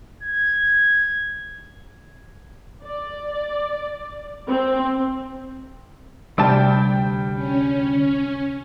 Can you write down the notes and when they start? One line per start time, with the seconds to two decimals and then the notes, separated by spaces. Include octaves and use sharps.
0.23 G#6
2.83 D5
4.48 C4
6.38 D2 C3 G3 D5 G5 A5
7.35 C#4